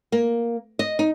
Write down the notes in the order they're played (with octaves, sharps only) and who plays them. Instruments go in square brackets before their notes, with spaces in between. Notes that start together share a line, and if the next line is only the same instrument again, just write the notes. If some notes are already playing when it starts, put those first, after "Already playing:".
[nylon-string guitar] A#3
D#5
D#4